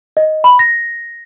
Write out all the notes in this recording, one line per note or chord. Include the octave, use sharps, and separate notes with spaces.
D#5
B5
A#6